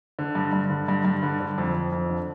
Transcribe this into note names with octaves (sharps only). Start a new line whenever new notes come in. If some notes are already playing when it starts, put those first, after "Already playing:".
D3
G2
G2
D3
G2
G2
D3
D3
F2
F2
F2
D3